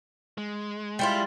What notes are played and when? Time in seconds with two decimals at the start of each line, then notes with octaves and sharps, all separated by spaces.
0.38 G#3
0.99 G3 E4 F4